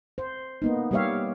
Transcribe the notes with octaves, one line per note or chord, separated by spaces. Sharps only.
C5
A#3 B3 D#4
G3 A#3 G4 C#5 E5 F5